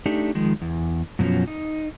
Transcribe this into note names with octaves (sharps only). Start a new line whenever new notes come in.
A3 D4 D#4 G4
D#3 F3 G#3
E2
F#2 B2 F3 F#3 C#4
D#4